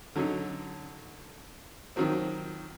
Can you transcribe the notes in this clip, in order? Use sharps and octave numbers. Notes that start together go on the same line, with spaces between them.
D3 F#3 C#4 D#4
D#3 F3 F#3 C4